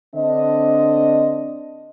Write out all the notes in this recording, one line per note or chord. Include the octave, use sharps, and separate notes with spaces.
D3 C4 D4 D#5